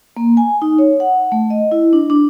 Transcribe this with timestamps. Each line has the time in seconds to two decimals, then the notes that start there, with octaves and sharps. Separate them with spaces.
0.17 A#3
0.37 G#5
0.62 D#4
0.79 C#5
1.00 F#5
1.32 A3
1.50 D#5
1.72 E4
1.93 D4
2.10 D4